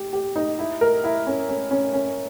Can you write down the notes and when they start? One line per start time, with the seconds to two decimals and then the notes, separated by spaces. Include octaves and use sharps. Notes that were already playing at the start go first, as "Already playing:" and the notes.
Already playing: G4
0.13 G4
0.36 D#4
0.59 E4
0.81 A#4
1.04 E4
1.27 C#4
1.49 C#4
1.71 C#4
1.93 C#4